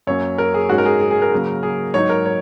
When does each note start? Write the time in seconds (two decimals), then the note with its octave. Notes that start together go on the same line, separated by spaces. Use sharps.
0.07 F#2 F#3 A#3 C#4 C#5
0.38 A#4
0.54 G#4
0.69 G#2 G#3 C#4 F#4
0.78 A#4
0.85 G#4
1.01 G#4
1.11 G#4
1.22 A#4
1.32 C#3 F#3 A#3
1.63 G#4
1.94 G#2 F#3 D#4 C#5
2.09 A#4
2.26 C#5